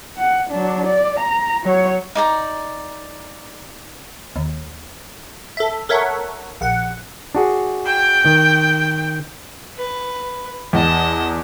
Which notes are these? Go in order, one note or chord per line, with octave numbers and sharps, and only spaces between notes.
F#5
F#3 D4
D5
A#5
F#3 C#5
D#4 D5 A#5
D#2
A4 E5
A4 A#4 C#5 E5 F#5
A#1 F#5
D4 F#4 G#4
G5
D#3
B4
E2 D#5 A5